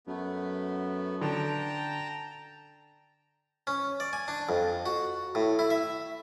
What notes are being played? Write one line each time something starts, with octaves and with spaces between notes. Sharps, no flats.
F#2 A3 B3
D3 G5 A5 A#5
C#4
D5
G#5
D4
F2
F#4
A2
E4
E5